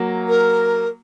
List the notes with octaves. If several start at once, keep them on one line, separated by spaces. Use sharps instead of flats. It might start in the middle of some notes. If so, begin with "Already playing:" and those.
Already playing: F#3 A#3
A#4